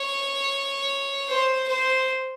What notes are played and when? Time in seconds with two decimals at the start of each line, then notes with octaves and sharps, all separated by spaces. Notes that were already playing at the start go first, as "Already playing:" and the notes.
Already playing: C#5
1.28 C5
1.68 C5